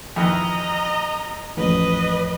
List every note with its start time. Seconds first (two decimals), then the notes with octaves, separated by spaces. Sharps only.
0.16 F2 D#3 E3 D#5 A#5
1.57 A1 F2 B4 D#5